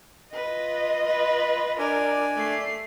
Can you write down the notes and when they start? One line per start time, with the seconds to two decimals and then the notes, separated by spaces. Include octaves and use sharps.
0.33 F4 B4 D#5
1.06 B4
1.79 D4 A#4 D5 G#5
2.36 A3 C7